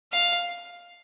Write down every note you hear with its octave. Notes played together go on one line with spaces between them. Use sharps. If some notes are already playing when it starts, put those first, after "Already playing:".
F5